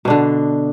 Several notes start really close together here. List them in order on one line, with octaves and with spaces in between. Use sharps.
B2 D4 D3